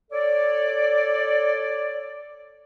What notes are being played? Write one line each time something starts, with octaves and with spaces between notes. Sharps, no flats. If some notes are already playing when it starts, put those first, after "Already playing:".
A4 C#5 D5